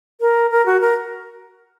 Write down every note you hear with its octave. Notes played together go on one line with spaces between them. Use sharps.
A#4
A#4
F#4
A#4